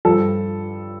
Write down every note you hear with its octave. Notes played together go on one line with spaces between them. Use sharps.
G2 F3 A4